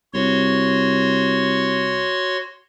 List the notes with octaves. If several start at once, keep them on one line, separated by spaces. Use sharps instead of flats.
C2 F#4 C#5 C6